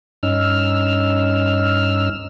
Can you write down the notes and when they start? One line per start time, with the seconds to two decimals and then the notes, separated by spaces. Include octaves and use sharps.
0.23 G2 C#4 D#4 E6 F6